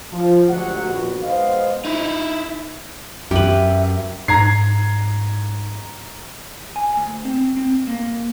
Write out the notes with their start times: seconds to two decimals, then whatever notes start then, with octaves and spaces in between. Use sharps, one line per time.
0.11 F3
0.48 D2 F#3 G#3 G4 F#5
0.83 A#1 D#2 B3 F#4
1.23 B1 G#3 B3 C5 D#5 F5
1.85 D#4 E4
3.31 F#2 G4 B4 E5
4.28 G#2 A#5 G#6 C7
6.76 G#5
6.97 D2
7.25 C4
7.57 C4
7.87 A#3